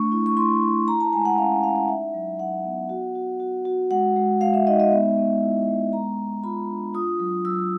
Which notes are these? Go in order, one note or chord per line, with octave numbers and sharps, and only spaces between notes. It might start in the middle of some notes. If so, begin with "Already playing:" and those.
Already playing: A3 D4 C#6
E4
C#6
E4 C6
E4
E4 A#5
A5
G#3 G#5
F#5
C#4 F5
C#4 F5
F#5
D#4 E5
F#3
F#3 F#5
B3
F#4
F#4
F#4
F#4
G#3 F#5
G#3
G#3 F5
E5
D#4 D#5
D#5
B3 E5
B3
E4
G#3
B3 A#5
B3
F4 B5
D4
F4 D#6
F#3
F#3 E6